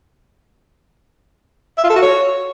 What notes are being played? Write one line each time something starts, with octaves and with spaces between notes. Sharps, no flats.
E5
F4
A4
F#4
C#5